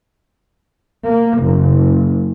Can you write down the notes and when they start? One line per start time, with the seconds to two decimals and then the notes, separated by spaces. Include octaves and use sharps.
1.05 A#3
1.40 F#1